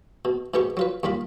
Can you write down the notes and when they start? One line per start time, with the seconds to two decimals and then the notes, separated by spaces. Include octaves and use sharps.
0.25 B2
0.54 G#2 B2 B3 G4 C#6
0.77 F#3 F4 B4
1.03 D#2 G3 F4 B5